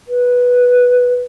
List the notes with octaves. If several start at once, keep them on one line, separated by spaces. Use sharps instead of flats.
B4